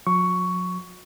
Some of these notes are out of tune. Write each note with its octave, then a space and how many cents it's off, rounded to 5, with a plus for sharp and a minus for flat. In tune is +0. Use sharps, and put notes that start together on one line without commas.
F#3 -40 C#6 +10